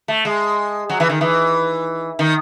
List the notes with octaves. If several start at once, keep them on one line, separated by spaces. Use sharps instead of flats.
A3
G#3
F#3
E3
D#3
E3
D#3